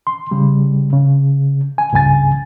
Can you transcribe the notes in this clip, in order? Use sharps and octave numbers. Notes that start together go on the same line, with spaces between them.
C6
C#3 G3
C#3
G#5
C#2 G2 C#3 G#5 A6